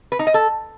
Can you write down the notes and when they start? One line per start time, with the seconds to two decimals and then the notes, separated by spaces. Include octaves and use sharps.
0.12 B4
0.19 D#4
0.27 D#5
0.34 A4